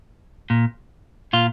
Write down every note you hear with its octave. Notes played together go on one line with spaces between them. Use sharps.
A#2
A#2 F4